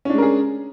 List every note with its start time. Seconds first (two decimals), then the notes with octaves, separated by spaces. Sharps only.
0.05 C#4
0.10 D4
0.14 G#3
0.18 A#4
0.22 G#4